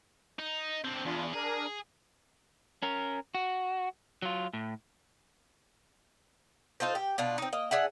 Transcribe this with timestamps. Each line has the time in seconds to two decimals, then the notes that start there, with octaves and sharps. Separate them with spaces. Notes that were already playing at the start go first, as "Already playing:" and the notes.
0.39 D#4
0.85 D3 C4
1.06 E2 D4 F4
1.34 D4 G#4 A#4
2.83 C#4 A#4
3.35 F#4
4.22 F#3 F4
4.53 A2
6.80 D#4 F4 A4 C5
6.95 G4
7.18 B2 D4 F4
7.38 C4 D#4
7.53 A#3 D#5
7.71 D4 G#4 E5 F#5